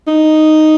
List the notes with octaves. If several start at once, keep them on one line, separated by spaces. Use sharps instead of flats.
D#4